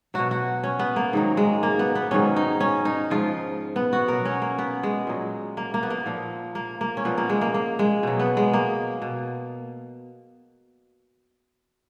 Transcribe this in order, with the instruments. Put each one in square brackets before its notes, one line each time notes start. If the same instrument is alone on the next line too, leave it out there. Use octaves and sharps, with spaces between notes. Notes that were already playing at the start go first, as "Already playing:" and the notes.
[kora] B2 F#3 F#4
F#4
C#4
B3
A#3
G#2 D#3 F#3
G#3
A#3
B3
B3
G#2 D#3 F#3 C#4
D#4
C#4
D#4
G#2 F3 F4
B3
F#4
B2 F#3 A#4
C#4
A#3
B3
G#3
A#2 F#3
A#3
A#3
B3
A#3
A#2 F3
A#3
A#3
C#4
A#2 F3 B3
A#3
G#3
A#3
A#3
G#3
B2 F#3
B3
G#3
A#3
B2